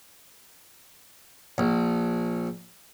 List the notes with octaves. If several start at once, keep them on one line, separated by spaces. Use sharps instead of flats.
A#1